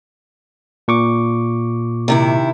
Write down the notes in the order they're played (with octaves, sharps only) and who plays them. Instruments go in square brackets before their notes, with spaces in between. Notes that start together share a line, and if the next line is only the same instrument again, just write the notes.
[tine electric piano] A#2 C#6 D6
[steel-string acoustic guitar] C3 D#3 E4